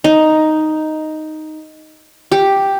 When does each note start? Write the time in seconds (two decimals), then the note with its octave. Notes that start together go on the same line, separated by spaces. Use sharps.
0.04 D#4
2.32 G4